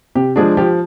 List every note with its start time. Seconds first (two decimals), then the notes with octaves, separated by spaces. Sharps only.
0.15 C3 G4
0.36 F3 G#3 D4 G#4
0.57 F3 G4